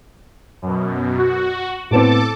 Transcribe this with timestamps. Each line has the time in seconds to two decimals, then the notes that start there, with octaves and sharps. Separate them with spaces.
0.62 F#2 B2
1.18 F#4
1.91 A2 B3 C4 A4 A5 D6